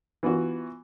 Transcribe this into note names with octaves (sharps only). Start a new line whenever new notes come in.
E3 B3 F4 F#4